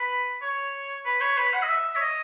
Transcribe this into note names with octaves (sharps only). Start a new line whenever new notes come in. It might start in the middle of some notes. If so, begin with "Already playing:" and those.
Already playing: B4
C#5
B4
C#5
B4
F#5
D#5
E5
C#5
D#5